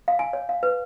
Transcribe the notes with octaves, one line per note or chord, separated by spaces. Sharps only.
F5
G#5
C#5
F5
B4